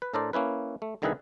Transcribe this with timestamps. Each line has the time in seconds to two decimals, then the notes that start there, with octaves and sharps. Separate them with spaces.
0.02 B4
0.14 A2 D4 A4 A#4 C5 D5
0.33 A#3 C#4 E4 B4
0.82 A3
1.02 C2 D3 D#3 E4 G#4 B4